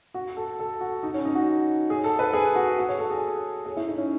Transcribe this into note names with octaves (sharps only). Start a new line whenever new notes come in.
F#4
A4
A4
F#4
D#4
C#4
D#4
F#4
G#4
A4
B4
G#4
F#4
F#4
C#5
A4
G#4
G#4
E4
D#4
C#4